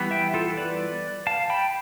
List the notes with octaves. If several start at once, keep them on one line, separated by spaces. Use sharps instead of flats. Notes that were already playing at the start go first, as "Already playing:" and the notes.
Already playing: E3 G3 B3
E5 G5
F4 A4
B4 D5
F5 A5
G5 B5